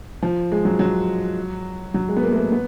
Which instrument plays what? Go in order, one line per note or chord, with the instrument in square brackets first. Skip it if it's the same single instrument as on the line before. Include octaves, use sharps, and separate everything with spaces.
[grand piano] F3
G#3
F#3
F#3
F#3
G#3
B3
A#3
A3
A#3
B3